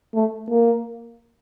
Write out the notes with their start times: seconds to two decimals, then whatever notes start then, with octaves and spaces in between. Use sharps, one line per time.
0.14 A3
0.50 A#3